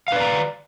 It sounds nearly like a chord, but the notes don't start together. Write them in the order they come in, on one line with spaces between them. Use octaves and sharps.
F5 B4 D5 A#5